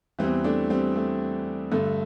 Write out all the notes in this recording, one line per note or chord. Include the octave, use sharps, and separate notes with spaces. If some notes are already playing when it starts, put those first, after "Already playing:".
E2 E3 G3 C4
A3 D4
G3 C4
A3
G2 D3 A3